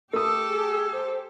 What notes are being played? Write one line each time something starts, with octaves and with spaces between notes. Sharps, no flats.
A3 G4 A4 D#6 E6
G#4
C5